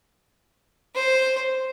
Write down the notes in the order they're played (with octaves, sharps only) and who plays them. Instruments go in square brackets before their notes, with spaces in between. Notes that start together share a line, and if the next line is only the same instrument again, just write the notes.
[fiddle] C5